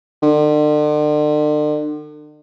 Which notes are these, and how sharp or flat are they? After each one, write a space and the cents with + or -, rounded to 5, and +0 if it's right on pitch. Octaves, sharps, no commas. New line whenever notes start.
D3 +40